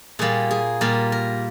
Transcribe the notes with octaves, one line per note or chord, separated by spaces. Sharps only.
A#2 G3 A#3 G#4
G#4
A#2 G3 A#3 A#4
A#4